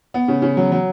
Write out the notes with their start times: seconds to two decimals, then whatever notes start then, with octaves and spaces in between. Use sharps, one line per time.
0.14 B3
0.28 C#3
0.42 C#3
0.57 F#3
0.72 F#3